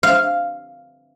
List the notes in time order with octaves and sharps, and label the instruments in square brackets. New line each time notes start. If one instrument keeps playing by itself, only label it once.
[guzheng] F5